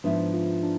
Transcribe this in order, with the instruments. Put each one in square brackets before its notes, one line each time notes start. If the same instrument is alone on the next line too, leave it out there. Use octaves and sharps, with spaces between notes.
[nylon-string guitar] G#2 F3 B3 E4 [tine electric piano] D4
[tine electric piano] F4
D4